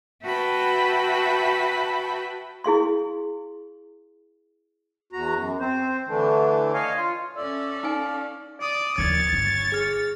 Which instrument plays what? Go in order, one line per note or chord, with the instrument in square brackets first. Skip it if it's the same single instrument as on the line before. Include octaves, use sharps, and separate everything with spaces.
[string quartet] F#4 B4 E5 G5 A5 B5
[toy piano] E4 G#4 F5 C6
[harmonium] E2 F#4 A#5
F#2
C4 C5
D3 E3 A3 D4
C#5 D#5 F5 G#5
F4
[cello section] C#4 A4 [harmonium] D5 [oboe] E5
[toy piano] D#4 G#5 [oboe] F5
[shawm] D5 [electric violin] D#6
[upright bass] D#2 F3 [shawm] C#5 [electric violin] A6
[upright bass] G1
[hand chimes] G#4 F6